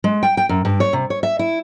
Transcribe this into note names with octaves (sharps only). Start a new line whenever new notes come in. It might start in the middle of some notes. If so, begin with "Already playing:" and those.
G#3
G5
G5
F#2
G2
C#5
C3
C#5
E5
E4